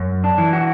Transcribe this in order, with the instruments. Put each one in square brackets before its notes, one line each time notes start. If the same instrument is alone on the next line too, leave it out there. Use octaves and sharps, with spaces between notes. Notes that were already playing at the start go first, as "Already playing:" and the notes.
Already playing: [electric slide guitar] F#2
D4
E3
F#4